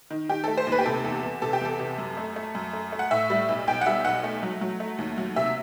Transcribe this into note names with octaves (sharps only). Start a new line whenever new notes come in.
D#3
D#3 G4
A3 A4
C5
D#2
B4
G4
C3 A4
E2
E2
C3 A4
G4
E2 A4
C3
F#2
A3
A3
F#2
A3
A3
F#5
A2 E5
G3
B1
B1 G5
F#5
G3 E5
B1 F#5
A3
F#3
F#3
A3
D#2
F#3
C3 E5